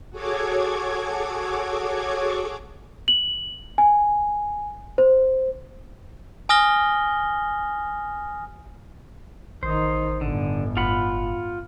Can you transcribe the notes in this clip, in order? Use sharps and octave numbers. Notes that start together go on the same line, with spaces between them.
F#4 G#4 A4 C#5 D6 G#6
F#7
G#5
C5
G#5 D#6 F6 A#6 G7
A1 D#3 D#4 C5
G1 A2 D3
F#1 F4 F#5 B5